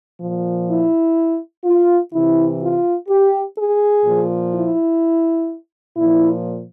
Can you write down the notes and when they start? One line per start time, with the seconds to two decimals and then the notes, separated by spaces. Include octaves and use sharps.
0.21 A#2 F3
0.69 E4
1.65 F4
2.12 C3 E3 E4
2.61 F4
3.09 G4
3.56 G#4
4.05 A#2 F3
4.53 E4
5.97 A#2 F3 E4